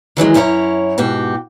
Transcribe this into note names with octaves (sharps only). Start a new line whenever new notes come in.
D#3 E3 F#3 G#3
F#2 C#4 E4 C#5 A#5
G#2 B2 F#4 G4